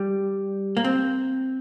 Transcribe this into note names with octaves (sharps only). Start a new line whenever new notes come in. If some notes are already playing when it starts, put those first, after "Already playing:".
Already playing: G3
A#3
C4